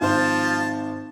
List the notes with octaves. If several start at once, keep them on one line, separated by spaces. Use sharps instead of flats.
G#1 F3 C5 A5